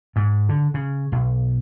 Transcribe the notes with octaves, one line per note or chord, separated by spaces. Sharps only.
G#2
D3
C#3
B1